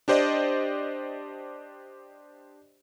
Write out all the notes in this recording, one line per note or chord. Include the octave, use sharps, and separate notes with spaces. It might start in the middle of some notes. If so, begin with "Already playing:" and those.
D4 G4 C5 D5 D#5